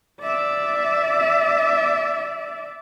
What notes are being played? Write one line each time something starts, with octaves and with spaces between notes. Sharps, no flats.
D5 E5